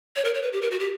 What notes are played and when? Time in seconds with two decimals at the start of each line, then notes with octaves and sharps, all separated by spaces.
0.16 C#5
0.25 A#4
0.34 C#5
0.42 B4
0.53 G4
0.62 A#4
0.71 F#4
0.80 G4